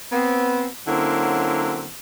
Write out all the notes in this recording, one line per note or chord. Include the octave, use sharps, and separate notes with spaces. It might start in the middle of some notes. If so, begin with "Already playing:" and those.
B3 C4
D3 F#3 A#3 C4 C#4 E4